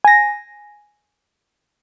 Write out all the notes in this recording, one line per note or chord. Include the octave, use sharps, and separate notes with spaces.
G#5 A#6